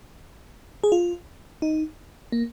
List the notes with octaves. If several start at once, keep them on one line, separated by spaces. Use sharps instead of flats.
G#4
F4
D#4
A#3